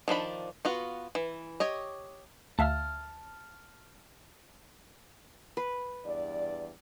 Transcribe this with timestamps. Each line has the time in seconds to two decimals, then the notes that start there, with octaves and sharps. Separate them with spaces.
0.08 D#3 F3 D4 B5
0.65 B3 F4 F#4
1.15 E3
1.60 G4 C#5 D#5
2.59 D2 E5 F5 A5 F6
5.57 B4
6.05 E2 G2 D5